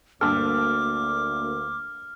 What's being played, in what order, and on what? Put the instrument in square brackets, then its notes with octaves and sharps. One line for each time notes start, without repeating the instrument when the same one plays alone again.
[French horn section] D2 A#3 [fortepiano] G2 A4 [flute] D6 [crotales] F6